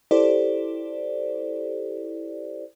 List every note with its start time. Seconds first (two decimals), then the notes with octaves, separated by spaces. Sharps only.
0.11 E4 G4 A4 C5 D5